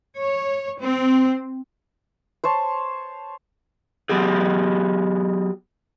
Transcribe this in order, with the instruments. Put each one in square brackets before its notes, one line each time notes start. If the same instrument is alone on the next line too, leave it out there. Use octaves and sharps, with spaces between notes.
[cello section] C#5
C4
[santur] C5 C#5 A5
[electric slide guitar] F#3 B3 G4 G#4